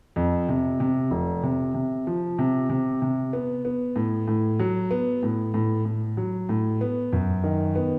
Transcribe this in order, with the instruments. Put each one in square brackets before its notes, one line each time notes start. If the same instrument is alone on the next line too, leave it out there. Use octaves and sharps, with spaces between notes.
[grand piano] F2
C3
C3
F1
C3
C3
F3
C3
C3
C3
B3
B3
A2
A2
F#3
B3
A2
A2
A2
F#3
A2
B3
F#2
D#3
B3